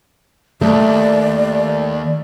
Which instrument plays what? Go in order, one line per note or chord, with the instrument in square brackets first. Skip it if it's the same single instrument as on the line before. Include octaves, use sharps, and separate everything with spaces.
[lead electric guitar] D#2 [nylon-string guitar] A3 [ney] D5